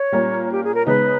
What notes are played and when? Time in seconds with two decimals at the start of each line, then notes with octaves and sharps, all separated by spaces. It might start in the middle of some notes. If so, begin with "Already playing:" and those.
Already playing: C#5
0.12 A#2 G3 A#3 C#4
0.52 G4
0.64 G#4
0.75 A#4
0.87 C#3 G#3 B3 D#4 B4